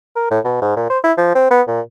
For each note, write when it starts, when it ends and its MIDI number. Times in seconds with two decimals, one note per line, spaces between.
0.16 0.29 70
0.31 0.39 45
0.45 0.61 47
0.62 0.74 44
0.76 0.90 46
0.90 0.98 72
1.04 1.12 64
1.17 1.32 53
1.35 1.49 60
1.51 1.62 59
1.67 1.80 46